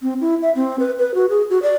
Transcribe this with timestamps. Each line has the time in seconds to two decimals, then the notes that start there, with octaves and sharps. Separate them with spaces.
0.02 C4
0.21 E4
0.42 E5
0.55 C4
0.80 B4
0.99 B4
1.14 F#4
1.30 G#4
1.50 F#4
1.63 D5